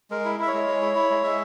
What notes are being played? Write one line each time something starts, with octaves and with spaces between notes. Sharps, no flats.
G#3 A#4
E4
E4 E5
C#5
G#3
G#3
E4
E4
G#3
G#3 E5